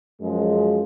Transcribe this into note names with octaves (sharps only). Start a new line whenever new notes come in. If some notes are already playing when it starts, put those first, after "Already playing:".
F#2 F3 G#3